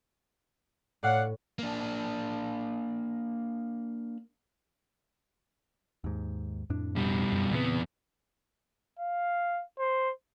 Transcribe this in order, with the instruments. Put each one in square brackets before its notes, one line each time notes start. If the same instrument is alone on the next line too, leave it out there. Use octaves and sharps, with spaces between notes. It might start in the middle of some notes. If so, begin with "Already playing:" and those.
[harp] A2 [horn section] D5 F5 F#5
[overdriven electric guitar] A#3 D4
[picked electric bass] D#2 G#2
F2 A2 D4
[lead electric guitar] B2 G3
[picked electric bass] F#2
[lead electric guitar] E2 B3 [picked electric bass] A#2 C#3 C4
[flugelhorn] F5
C5